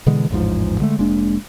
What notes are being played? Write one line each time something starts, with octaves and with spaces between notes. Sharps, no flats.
B2 D3 E3 G#3
A1 E2 G#2 F3
D3 G#3 A3
F1 G#3 A#3 D4